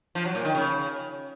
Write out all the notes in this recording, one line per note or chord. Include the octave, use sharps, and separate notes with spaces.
F3
F#3
A#2
D#3
C#3